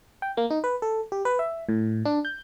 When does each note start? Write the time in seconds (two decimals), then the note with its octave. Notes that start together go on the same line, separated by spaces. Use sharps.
0.22 G5
0.37 A#3
0.50 D#4
0.64 B4
0.82 A4
1.12 G4
1.25 B4
1.39 E5
1.69 A2
2.05 D4
2.25 G6